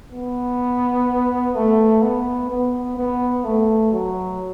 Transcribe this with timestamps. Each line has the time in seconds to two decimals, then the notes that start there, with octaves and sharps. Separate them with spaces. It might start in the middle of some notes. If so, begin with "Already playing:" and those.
0.12 B3
1.55 A3
2.02 B3
2.50 B3
2.97 B3
3.45 A3
3.92 F#3